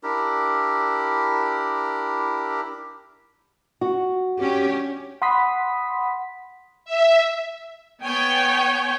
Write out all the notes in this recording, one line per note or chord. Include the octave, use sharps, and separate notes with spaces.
D4 E4 G4 A#4
F#4
C#4 D4 G4
F#5 B5 C6 D#6 B6
E5
B3 C#5 G5 G#5